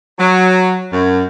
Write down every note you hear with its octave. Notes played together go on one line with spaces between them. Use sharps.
F#3
F#2